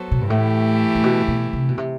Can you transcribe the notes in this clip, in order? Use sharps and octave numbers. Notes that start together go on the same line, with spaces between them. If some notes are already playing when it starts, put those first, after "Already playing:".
Already playing: F#3 B3 F#4 A4 C5
B2
G2
A2 E3 A3 E4 G4
A2
B2
B2
C3
B2
C3